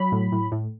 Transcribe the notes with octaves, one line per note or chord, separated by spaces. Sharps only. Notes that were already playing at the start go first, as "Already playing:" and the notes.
Already playing: F#3 B5
A2
A2
A2